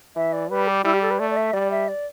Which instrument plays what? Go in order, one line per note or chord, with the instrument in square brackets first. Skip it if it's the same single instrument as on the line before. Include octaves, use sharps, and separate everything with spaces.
[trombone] E3 [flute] E5
[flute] D5
[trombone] G3 [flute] B4
[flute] G4
[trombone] G3 [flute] E4
[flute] G4
A4
B4
[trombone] A3 [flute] D5
[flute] D5
E5
[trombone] G3 [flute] D5
[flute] E5
D5